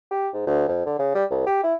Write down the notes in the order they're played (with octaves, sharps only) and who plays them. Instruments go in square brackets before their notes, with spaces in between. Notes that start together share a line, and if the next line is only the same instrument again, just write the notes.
[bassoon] G4
G#2
D2
F2
D3
C#3
G3
C2
G4
E4